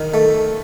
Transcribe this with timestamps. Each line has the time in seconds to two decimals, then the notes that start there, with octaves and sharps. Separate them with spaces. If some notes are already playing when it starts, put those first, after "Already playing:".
Already playing: D#3
0.14 A3